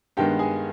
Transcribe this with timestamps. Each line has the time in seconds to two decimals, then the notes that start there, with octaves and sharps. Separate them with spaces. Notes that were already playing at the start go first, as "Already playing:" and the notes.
0.17 G2 D#3 G#3 B3 G4 G5
0.39 G#4 G#5